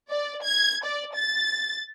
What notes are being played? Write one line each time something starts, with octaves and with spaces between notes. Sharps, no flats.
D5
G#6
D5
A6